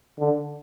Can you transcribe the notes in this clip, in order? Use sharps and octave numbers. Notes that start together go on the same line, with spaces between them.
D3